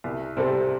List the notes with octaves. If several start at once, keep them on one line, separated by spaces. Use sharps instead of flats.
C2
C3 G3 C4 A4